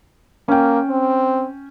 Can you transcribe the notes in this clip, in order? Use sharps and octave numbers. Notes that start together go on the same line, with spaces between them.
A#3 C#4 G5
C4